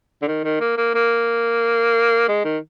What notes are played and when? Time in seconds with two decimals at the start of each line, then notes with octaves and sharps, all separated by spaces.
0.22 D3
0.28 D#3
0.44 D#3
0.60 A#3
0.77 A#3
0.95 A#3
2.28 G#3
2.45 D#3